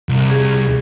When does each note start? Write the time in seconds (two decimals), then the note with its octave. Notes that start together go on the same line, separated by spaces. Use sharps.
0.09 C2
0.30 G#4